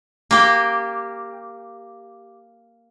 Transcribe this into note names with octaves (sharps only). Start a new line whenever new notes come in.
A#3 G4